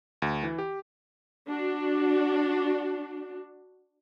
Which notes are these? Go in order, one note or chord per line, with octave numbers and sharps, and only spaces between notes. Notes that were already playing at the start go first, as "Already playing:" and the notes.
D2
E3
G4
D4 F#4